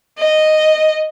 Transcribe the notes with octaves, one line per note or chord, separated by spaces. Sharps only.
D#5